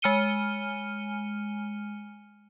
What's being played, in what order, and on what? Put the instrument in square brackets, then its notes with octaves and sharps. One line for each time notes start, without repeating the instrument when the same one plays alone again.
[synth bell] G#3 G#5 F6 C#7 D#7 G7